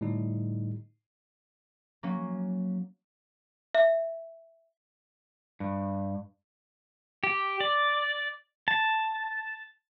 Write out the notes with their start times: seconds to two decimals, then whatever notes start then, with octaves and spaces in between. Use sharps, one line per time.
0.01 A2 D3 G3 D#4
2.03 F#3 A#3 C#4
3.75 E5
5.60 G2
7.24 G4
7.60 D5
8.68 A5